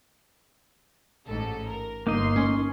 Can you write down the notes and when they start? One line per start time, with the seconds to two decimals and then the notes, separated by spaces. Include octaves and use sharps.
1.26 A1 G#2 A4
1.67 A#4
2.07 G1 A#3 D#4 D#5 C6
2.36 C#4